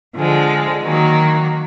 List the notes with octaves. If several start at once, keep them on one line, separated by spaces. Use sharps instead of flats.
D3 F3 G#3
D#3 F#3 A#3